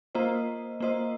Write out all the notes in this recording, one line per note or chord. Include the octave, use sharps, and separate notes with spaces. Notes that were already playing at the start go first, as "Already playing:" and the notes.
A#3 F4 C5 D#5
A#3 F4 C5 D#5